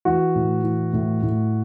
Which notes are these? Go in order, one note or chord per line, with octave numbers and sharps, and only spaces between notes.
E3 F#4
A2
E3
A2
A2